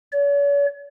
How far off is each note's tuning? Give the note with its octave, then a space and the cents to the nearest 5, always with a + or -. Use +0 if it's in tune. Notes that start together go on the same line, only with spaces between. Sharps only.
C#5 +45